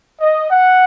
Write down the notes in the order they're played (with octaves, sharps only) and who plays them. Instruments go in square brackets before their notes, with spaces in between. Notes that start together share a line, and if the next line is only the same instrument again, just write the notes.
[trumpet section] D#5
F#5